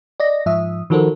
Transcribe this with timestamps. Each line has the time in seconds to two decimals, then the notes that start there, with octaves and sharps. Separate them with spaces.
0.20 D5 D#5 A#6
0.46 G#2 F3 E5 D#6
0.90 D#3 F3 F#4 A4 A#4 C5